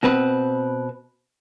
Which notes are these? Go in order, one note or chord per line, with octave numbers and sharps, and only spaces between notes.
B2 C4 B4